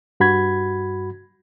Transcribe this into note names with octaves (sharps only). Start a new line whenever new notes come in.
G2 F#4 B5 G#6